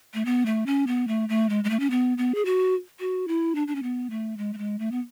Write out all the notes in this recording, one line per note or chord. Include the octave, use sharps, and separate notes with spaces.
A3
B3
A3
C#4
B3
A3
A3
G#3
G#3
A3
C#4
B3
B3
G#4
F#4
F#4
E4
D4
D4
C#4
B3
A3
G#3
A3
G#3
A3
B3